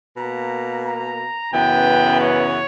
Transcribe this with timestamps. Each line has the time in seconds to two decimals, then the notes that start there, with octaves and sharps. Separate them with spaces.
0.17 B2 A#3 A#5
0.84 A#5
1.52 F#2 C#3 E3 B3 G5
2.20 C#5